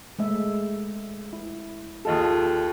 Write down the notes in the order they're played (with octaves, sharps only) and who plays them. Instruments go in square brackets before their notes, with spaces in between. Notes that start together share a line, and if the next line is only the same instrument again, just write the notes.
[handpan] G#3 A3 E5
E4
[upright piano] D#2 F4 A4 [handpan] G#4 D#5